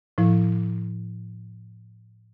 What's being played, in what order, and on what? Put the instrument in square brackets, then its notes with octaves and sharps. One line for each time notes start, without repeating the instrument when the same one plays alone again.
[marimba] A2 F3 E4